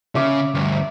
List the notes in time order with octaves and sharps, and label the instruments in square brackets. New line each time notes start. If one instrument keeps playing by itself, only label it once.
[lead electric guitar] C#3 [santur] E5 D6
[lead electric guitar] D2 G2